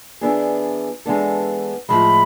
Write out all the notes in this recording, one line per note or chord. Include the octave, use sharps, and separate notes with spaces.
E3 B3 D4 G#4
E3 G#3 B3 D4 A4
A2 F3 G#3 B5